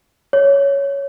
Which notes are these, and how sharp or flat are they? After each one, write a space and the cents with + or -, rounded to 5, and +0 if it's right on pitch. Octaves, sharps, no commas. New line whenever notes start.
C#5 +5